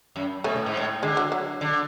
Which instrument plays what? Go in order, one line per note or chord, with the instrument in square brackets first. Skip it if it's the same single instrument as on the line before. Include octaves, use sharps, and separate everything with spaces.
[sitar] F#2
[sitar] B2 [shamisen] A3 C#4
[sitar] A2
G#2
A2
[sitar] D3 [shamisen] G#3
[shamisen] F#3
F#3
[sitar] D3